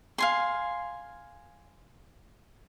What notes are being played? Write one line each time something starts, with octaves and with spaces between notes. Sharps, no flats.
F5 G#5 C6